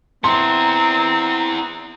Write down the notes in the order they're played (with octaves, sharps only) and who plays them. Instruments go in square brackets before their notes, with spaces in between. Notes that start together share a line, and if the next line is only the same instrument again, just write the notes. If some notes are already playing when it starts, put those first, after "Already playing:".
[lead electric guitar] B3 E4 [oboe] C4 [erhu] A#5 [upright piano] C6